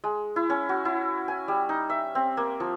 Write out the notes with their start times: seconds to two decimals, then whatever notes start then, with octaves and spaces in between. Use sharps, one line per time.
0.04 G#3
0.36 E4
0.50 C#4
0.69 F#4
0.85 E4
1.28 G#5
1.48 G3
1.69 D#4
1.90 E5
2.15 C4
2.37 A#3
2.60 F3